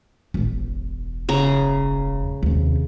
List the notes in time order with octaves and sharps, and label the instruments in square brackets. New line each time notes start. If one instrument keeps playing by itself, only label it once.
[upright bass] E1 A1
[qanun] C#3 A#5
[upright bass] D#2 C3